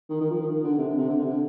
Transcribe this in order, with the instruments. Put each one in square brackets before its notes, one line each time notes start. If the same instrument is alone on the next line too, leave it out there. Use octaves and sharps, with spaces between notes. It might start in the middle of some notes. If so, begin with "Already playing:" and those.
[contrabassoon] D#3
D#3
F3
D#3
D#3
D3
C3
D3
C3
D3
C3
D3